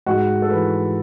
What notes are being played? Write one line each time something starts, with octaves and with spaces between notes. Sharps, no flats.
G#2 F#4
A4
E3 B4